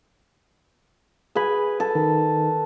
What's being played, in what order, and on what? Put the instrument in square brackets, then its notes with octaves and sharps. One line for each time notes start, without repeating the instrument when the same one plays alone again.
[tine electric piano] G#4 B5 [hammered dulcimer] B4 G#5
[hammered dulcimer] A4
[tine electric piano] D#3